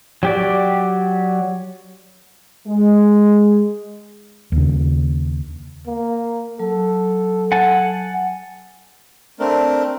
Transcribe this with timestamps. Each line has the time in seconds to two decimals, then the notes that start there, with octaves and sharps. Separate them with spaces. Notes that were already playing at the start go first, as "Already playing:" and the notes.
0.23 F#3 G4 D5
2.67 G#3
4.52 D#2 C#3
5.86 A#3
6.59 F#3 A4
7.52 F#5 G#5 A5
9.40 A3 C4 D4 A#4